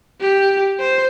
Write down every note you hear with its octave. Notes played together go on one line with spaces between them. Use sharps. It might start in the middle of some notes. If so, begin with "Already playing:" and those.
G4
C5